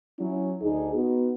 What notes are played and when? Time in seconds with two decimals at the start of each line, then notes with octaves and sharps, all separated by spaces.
0.18 F#3 C#4 E4
0.62 D2 D#4 G#4
0.94 B3 D#4 F#4